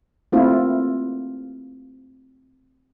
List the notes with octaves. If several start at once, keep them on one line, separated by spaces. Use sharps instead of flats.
A3 A#3 C4 E4 F4